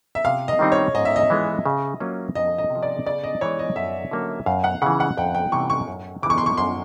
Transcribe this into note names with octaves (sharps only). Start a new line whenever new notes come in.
E5
C3 F5
D#5
D#3 G3 C4 D#4
C#5
G#2 D#5
E5
D#5
E3 G#3 B3
C#3
F#3 A#3 C#4 F4
F2 D#5
D#5
C3
F3
D5
C#3 D5
D#5
E3 G#3 C#5
D#5
F#2 E5
D3 F#3 A#3 C#4
F#2 F5
F#5
C#3 E3 F#5
F#5
F2 G5
G5
C3 E3 G3 C#6
C#6
F#2
C#3 E3 C#6 D6
C6
C#6
F#2 C6